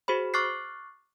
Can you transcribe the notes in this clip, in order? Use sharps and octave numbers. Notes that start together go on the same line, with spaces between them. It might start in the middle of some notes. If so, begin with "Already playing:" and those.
F#4 G#4 C5 B5
C#6 D6 F6 F#6 A6 C7